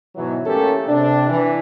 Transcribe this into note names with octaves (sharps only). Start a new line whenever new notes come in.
G#2 B2 E3 F#3
A3 A#3 C#4 G4 A4 A#4
C3 D4
E3